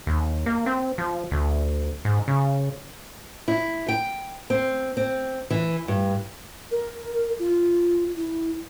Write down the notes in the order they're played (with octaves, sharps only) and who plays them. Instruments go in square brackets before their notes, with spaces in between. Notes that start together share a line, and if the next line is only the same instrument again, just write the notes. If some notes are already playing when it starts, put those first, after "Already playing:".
[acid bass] D#2
A#3
C4
F3
D2
G#2
C#3
[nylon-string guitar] E4
G5
C4
C4
E3
G2
[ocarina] A#4
F4
E4